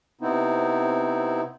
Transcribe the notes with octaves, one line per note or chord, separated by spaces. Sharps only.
C3 B3 C4 D#4 E4